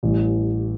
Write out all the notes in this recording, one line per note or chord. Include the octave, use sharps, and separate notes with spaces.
A1 A2 E3 G3